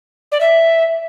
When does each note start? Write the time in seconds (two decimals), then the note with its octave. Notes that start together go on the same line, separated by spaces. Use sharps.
0.32 D5
0.41 E5